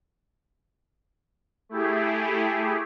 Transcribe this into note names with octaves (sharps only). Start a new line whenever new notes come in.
A3 E4 G4 G#4